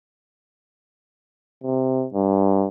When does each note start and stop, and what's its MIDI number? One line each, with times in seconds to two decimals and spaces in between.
1.64 2.06 48
2.14 2.67 43